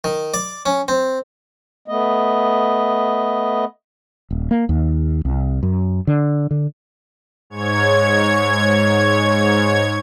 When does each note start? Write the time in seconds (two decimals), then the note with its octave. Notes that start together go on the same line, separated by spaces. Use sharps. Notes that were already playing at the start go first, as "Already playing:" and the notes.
0.04 D#3
0.34 D5
0.66 C#4
0.88 C4
1.88 A3 B3 D#5
4.30 D#1
4.51 A#3
4.69 D#2
5.25 C2
5.63 F#2
6.07 D3
6.51 D3
7.50 G#2 C#5 G#6